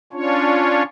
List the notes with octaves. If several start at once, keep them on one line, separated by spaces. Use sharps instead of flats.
C#4 D4 F4 C#5